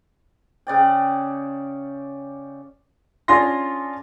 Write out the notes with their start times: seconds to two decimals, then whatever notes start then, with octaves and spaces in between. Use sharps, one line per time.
0.67 C#3 D5 G5
3.28 C#4 D4 F4 G#4 C6 A#6